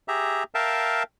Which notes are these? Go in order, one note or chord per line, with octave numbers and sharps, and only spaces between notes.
G4 G#4 E5 A#5
A#4 E5 F5 G5 A5